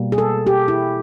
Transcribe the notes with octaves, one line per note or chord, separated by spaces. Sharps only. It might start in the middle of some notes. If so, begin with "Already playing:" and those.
Already playing: B2 G3 A#3
G#4
A4
G4
E4